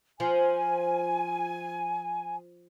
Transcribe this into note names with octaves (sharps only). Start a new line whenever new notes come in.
F3 G#5